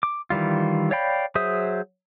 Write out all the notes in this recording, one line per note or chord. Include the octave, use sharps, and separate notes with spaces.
D6
D#3 E3 G3 F4
C#5 D5 F5 G5 B5
F#3 G#4 C5 E5 D#6